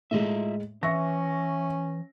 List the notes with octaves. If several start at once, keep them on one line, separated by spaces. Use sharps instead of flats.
A2 G#3 F4 D#5 E5
E3 C#4 E5 C#6 A#6